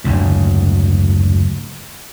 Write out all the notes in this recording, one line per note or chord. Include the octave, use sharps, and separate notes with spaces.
F#1 D2 G#2